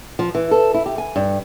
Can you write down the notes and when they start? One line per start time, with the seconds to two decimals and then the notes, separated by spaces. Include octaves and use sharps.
0.19 F3
0.35 E3
0.51 A4
0.74 E4
0.86 G4
0.98 G#5
1.16 G2